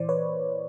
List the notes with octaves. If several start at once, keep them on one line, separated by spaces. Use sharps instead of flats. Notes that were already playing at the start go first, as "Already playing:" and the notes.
Already playing: A#2 E3 C5 D5
B4 C#5